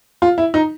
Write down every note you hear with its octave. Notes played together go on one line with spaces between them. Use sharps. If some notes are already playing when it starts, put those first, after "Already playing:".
F4
E4
D#4